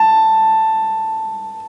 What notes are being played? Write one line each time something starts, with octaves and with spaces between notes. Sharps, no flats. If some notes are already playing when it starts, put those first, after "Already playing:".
Already playing: A5